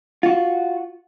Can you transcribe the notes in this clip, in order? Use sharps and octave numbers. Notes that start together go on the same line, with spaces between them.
F4 F#4